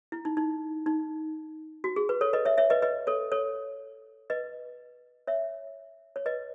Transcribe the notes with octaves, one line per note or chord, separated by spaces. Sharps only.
E4
D#4
D#4
D#4
F#4
G#4
B4
A4 C#5
B4 D#5
C#5 E5
C#5 E5
B4 D#5
B4 D#5
A4 C#5
A4 C#5
B4 D#5
C#5 E5
C#5
B4 D#5